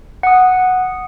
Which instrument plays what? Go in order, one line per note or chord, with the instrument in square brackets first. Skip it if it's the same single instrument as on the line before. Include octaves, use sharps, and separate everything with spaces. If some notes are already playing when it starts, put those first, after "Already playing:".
[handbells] F#5 D#6